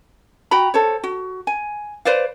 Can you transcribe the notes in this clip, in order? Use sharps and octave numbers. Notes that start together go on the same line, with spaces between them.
F#4 G5 A#5 B5
A4 C5 C#5
F#4
G#5
B4 C5 D5 F5